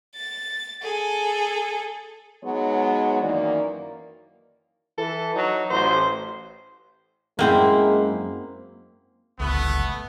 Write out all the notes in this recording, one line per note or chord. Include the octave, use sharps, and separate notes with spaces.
A6
G#4 A4
F#3 G#3 B3 D#4 F#4 C#5
F#2 D#3 E3 A#3 D5
E3 A4
F#3 D#4
A1 C5
F#2 G#3 A#3 C4 E4
G1 C#2 A3 B3